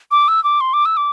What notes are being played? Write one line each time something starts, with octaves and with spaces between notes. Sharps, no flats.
D6
E6
D6
C6
D6
E6
D6